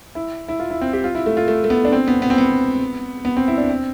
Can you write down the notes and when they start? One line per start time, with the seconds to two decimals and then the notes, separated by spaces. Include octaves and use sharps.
0.15 E4
0.48 E4
0.60 F4
0.70 E4
0.82 C4
0.93 G4
1.04 F4
1.15 E4
1.26 A3
1.37 F4
1.48 A3
1.64 A3
1.70 B3
1.85 D4
1.92 C4
2.08 B3
2.22 B3
2.30 C4
2.38 B3
3.25 B3
3.37 C4
3.48 E4
3.58 D4
3.70 C4